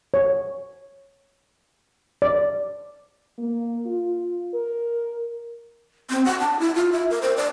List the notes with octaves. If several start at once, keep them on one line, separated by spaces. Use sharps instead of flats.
C#5
D5
A#3
F4
A#4
C4
F#5
A5
E4
F4
E5
A#4
C5
D5